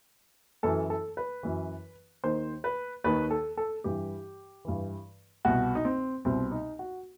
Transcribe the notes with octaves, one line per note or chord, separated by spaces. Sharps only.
F#2 E3 A4
A4
B4
F#2 E3
D#2 D#3 C5
B4
D#2 D#3 B4
A4
A4
G2 E3 G4
G2 E3
C2 B2 F#4
D#4
C4
C2 B2 C4
D#4
F#4